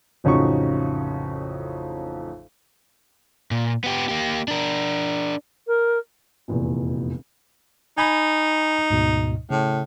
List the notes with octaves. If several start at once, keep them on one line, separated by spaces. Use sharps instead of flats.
A1 F2 C#3 D#4 F#4 C#6
A#2
B3 G4
A#3 G4
D4 A#4
A#4
F1 E2 A#2
D#4 G#5 B5
D2 G#2 B2
A2 C#3